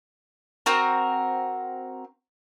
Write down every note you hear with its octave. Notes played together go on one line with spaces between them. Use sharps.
C4 F#4 A#4